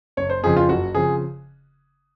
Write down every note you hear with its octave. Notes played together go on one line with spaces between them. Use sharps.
F#1 C#5
C5
F2 C#3 F3 C4 G#4
F4
F#1 F#4
C#3 F3 C4 G#4